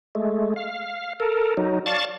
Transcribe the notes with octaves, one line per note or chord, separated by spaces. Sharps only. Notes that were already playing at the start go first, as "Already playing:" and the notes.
G#3 A3
F5
A4 A#4
F#3 D#4
D5 F5 A5 C#6 A6